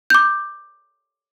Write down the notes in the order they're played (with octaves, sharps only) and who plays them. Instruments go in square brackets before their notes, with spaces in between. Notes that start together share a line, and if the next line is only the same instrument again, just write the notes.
[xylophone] D6 G6